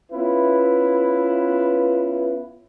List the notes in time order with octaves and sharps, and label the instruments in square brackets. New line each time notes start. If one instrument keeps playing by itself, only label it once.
[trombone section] B3 C#4 E4 F4 B4